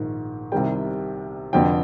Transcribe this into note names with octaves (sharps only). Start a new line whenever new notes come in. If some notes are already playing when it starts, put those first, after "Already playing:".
Already playing: A#1 G#2 D#3
C2 C3 D#3 G3 G5
F1 F2 D3 F3 G5